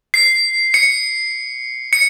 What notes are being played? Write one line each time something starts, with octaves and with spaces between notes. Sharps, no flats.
C7
C#7
C#7